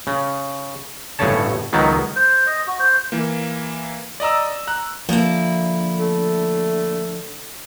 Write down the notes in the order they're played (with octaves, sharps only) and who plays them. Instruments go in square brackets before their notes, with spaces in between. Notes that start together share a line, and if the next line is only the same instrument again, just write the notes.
[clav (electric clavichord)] C#3
G1 A2 C#3 C#5 A5
C#2 D#3 F#3 B3
[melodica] C5
D#5
F#4
C5
[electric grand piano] E3 A#3
D5 D#5 A#5 E6
A#5 F#6
[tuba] D3 [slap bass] F3 [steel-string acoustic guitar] A#3 E4
[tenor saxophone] A3